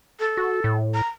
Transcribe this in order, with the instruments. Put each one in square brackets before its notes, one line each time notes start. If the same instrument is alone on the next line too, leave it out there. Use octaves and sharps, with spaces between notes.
[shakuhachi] A4
[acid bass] F#4
A2
[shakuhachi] A#5